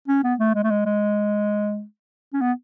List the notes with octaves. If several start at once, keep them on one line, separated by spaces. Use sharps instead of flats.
C#4
B3
A3
G#3
A3
G#3
G#3
C#4
B3